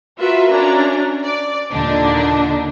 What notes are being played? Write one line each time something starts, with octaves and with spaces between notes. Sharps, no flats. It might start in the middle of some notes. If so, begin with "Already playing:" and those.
F4 F#4 A#4 B4 E5
C#4 D4 A#5
D5
D#2 A#2 D3 D4 D#4